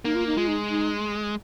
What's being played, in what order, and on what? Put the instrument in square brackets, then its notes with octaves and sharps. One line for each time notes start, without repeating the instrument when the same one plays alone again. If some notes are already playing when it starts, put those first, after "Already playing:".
[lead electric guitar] A#3 [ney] D#4
[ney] F4
D#4
[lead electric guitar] G#3 [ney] F4
[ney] D#4
D#4